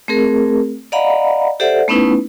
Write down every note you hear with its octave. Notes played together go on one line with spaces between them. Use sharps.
A3 C4 G#4 A#4
D5 D#5 F5 F#5 A#5 B5
G4 A4 C5 D5 E5 F#5
A3 B3 C#4 D#4 E4 B4